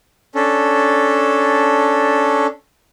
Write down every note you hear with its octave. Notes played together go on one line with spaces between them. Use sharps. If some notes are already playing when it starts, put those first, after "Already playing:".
C#4 D4 A4